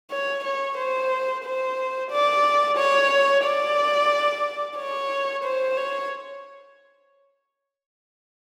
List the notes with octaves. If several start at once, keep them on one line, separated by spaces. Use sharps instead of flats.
C#5
C#5
C5
C5
D5
C#5
D5
C#5
C5
C#5